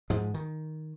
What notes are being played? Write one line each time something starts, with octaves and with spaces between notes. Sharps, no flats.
G#2 F3 G#3
D#3